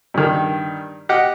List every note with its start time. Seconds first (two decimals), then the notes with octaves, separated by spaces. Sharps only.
0.14 G2 D#3
1.09 G4 D#5 F#5